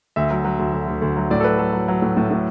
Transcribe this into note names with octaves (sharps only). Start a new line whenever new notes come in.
D2 E5
F#3
F#3
D2
D3
D2
D2
F#3
A2 D5
A4
F#3 B4
F#3 A4
F#3
F#3
A2
A2
A2